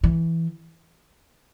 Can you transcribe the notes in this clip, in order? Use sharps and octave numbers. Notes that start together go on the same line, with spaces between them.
E3